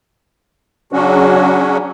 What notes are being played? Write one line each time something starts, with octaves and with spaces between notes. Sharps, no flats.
C#3 F#3 C#4 D4 F#4